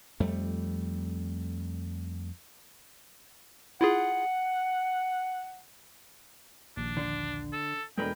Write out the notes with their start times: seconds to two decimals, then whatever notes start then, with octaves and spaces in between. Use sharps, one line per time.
0.20 F2 G3 A3
3.81 E4 F4 G#4 F#5
6.77 A#1 D#2 D4
6.97 D3
7.53 A4
7.98 E2 B2 D3 G#3 A#4 B4 G5